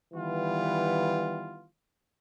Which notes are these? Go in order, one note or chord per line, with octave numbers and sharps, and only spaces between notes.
D#3 E3 G3 B3 F4